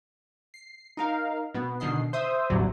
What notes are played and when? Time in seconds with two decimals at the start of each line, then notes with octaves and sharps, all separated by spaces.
0.54 C7
0.97 D#4 A#4 F5
1.54 B2 B3
1.80 B2 D3 D#3 D#5 C7
2.13 C5 E5 D#6
2.50 A1 E2 G2 D3 F#3 G3